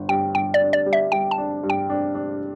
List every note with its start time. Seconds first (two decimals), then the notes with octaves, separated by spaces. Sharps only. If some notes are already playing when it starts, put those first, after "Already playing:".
Already playing: G1
0.09 G2 G5
0.35 G1 G5
0.54 D5
0.61 D4
0.73 D5
0.86 G3
0.93 E5
1.12 G3 G5
1.31 A5
1.38 D4
1.63 G2
1.70 G5
1.90 D4
2.15 D4